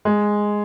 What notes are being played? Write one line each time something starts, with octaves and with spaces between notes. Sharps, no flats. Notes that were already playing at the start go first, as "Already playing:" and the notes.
G#3